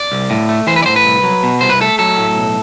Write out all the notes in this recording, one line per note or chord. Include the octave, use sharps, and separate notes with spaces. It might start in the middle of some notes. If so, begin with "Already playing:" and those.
Already playing: D5
C2
A2
A3
E3 C5
B4
D5
A2 C5
B4
C2
F#3
B2
C2 C5
B4
A3 A4
F#3 A4
A2
B1